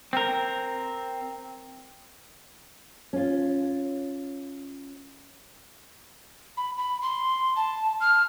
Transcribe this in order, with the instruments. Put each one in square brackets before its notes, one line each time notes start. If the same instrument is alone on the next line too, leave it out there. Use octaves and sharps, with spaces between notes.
[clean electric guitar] C4 A#4
[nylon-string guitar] C#4 F4
[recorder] B5
B5
C6
A5
F6